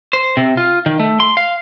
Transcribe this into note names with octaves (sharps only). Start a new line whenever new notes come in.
C5
C3
F4
D#3
A3
C6
F5